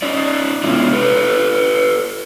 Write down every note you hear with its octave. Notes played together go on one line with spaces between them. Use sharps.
C#4 D#4 D5
C3 G#3 B3 D4 E4 F4
G4 A4 B4